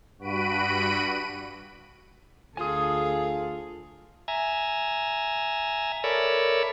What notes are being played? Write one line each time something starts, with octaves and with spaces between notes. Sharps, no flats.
G2 F#4 B5 D7 D#7
D2 F4 G#4 A4 G#5 D#6
E5 G#5 A#5
A4 A#4 C#5 D5 E5 B5